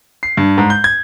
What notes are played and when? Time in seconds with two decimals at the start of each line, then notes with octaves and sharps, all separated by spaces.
0.23 C7
0.37 G2
0.58 G#2
0.70 G6
0.84 G#6